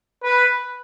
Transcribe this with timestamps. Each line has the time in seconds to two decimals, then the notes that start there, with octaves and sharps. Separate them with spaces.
0.23 B4